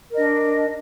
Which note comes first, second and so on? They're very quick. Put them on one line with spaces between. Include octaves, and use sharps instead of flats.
A#4 D#5 D4